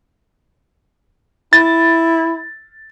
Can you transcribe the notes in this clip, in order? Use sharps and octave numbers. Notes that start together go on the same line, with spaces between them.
E4 A6